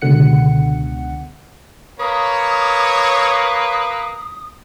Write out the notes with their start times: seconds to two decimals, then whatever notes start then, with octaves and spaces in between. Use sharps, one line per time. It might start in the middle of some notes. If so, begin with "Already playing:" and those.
0.02 C#2 B2 D3 F#5 C#7
2.00 A#3 B4 C#5 D#6